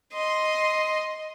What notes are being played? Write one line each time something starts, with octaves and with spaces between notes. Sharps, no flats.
D#5 C6